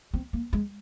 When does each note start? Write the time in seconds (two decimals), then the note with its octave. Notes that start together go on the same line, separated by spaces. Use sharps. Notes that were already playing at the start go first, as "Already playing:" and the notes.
0.14 C4
0.33 A#3
0.53 G#3